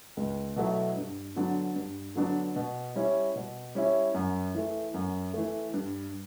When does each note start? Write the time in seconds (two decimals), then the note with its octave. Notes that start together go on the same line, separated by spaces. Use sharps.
0.17 C#2
0.56 B2 F#3 A3 E4
0.97 G2
1.36 D3 F#3 B3 D4
1.76 G2
2.16 D3 F#3 B3 D4
2.56 B2
2.96 G3 C#4 E4
3.35 B2
3.75 G3 C#4 E4
4.14 F#2
4.55 E3 A3
4.94 F#2
5.34 E3 A3
5.74 G2